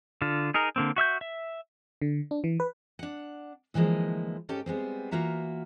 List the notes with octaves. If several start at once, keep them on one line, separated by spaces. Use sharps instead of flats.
D3 F4
D#4 G#4 A#4
D3 A#3 C4
F#4 E5 E6 G6
E5
D3
D4
E3
B4
D4 F#5
D2 E3 F3 G#3 A#3
G#2 C#4 G4 A4 G5
G3 G#3 B3 C4
E3 A#3 F4 F#4 E5 A#5